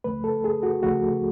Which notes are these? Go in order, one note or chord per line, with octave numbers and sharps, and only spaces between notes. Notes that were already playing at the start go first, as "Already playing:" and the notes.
C#2 C#3 F3 A3 B4
A4
G#4
F#4
C#2 C#3 F3 A3 F#4